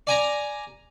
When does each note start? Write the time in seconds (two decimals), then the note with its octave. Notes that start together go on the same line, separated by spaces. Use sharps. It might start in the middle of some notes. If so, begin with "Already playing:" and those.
0.07 D5 G#5 A#5